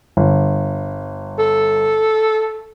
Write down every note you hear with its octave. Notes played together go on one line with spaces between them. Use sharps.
G1
A4